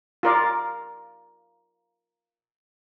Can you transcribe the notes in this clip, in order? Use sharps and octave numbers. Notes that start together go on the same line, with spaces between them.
F4 A#4 D5